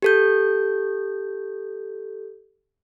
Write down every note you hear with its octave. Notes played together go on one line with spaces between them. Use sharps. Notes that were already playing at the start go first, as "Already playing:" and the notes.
G4 A4 G6